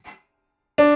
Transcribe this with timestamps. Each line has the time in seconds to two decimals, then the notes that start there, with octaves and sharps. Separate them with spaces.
0.78 D4